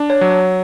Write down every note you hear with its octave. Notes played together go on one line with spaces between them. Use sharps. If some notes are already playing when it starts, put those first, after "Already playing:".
Already playing: D4
C#5
F#3
C#5